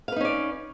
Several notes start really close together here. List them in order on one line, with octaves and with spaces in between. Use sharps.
F5 B4 D#4 C#4 D5